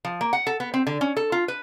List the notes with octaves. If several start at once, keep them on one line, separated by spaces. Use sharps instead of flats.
F3
A#3
F#5
A4
B3
C4
D3
C#4
A4
F4
B4